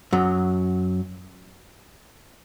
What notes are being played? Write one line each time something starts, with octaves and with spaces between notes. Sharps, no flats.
F#2 F#3